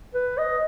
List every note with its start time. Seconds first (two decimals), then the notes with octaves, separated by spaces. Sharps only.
0.14 B4
0.38 D#5